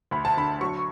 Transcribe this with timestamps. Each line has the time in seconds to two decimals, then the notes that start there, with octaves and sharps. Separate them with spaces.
0.11 D2 B5
0.25 A5
0.37 D3 B5
0.61 F#3 C#6